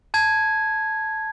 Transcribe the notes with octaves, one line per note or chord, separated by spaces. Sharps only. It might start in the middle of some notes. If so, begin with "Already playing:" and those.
A5 G#6